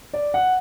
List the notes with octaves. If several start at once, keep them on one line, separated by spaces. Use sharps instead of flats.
D5
F#5